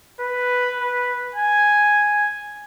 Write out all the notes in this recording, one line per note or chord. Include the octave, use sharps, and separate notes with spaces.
B4
B4
G#5